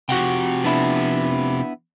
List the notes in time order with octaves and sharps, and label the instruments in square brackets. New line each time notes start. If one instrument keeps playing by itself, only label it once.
[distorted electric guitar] C3 F3 [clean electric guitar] F#4 F#5 G5
[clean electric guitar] B3 D4 E4